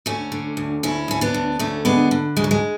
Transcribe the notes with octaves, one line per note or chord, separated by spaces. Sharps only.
D2 A3 C#4
D3
D2
D2 C#4 E4
D2 C#4
B3 D4
D2
D2 A3 C#4
D3 G#3 B3
D3
D2 G#3
F#3
G#3